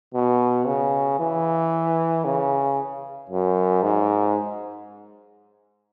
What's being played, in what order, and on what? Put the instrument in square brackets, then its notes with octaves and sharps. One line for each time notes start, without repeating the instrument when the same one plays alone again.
[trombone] B2
C#3
E3
C#3
F#2
G#2